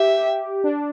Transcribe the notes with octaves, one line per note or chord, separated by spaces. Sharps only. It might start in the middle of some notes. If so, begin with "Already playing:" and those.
Already playing: G4 E5
D4